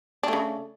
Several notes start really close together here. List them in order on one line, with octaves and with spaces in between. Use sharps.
D4 A3 C#3